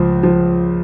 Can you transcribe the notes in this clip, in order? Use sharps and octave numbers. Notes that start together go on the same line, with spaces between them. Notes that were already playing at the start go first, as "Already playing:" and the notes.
Already playing: C#2 F3
F3